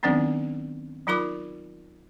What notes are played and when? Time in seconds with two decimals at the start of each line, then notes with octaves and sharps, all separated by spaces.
0.03 D#3 F#3 B3 C4 D4 D#4
1.07 F#3 D#4 F4 A#4 B5 D6